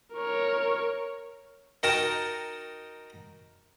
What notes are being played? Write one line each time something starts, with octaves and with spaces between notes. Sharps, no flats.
A#4 C#5
D#4 F#4 A#4 G5 A5 A#5